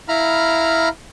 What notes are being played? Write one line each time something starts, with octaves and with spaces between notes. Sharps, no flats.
E4 F5 A#5 B5 F6